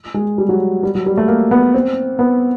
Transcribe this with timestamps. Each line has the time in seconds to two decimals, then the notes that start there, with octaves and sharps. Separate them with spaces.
0.14 G#3
0.38 G3
0.49 F#3
0.83 G3
0.95 F#3
1.06 G3
1.17 A3
1.28 A#3
1.51 B3
1.74 C4
2.19 B3